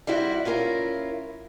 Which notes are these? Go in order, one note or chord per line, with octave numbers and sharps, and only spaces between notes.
G3 C4 E4 F#4
C#4 E4 F4 G#4 A#4